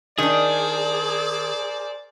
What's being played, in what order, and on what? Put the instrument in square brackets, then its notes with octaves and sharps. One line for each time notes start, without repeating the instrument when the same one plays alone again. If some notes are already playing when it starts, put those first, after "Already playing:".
[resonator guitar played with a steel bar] D#3 D4 [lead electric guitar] G#4 [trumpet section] A#4 C5 D5